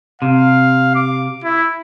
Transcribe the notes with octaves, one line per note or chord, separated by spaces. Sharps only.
C3 F5
D6
E4